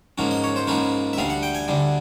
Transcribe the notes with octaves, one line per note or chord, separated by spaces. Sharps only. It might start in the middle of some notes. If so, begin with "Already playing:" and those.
G#2 F3 A#3 C#4
D#5
C#5
C5
G#2 F3 A#3 C#4 B4
E5
D2 D3 G3 F5
F#5
G5
G#5
D2 D3 G3